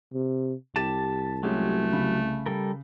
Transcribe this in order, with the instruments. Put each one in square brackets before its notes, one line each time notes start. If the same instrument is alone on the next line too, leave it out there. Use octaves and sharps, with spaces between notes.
[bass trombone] C3
[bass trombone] C2 [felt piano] G4 A6 E7 [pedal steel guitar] A5
[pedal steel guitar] F#3 [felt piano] G#3 C#4 G4 [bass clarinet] A3
[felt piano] C#3 B5
[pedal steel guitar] G3 A4 A#4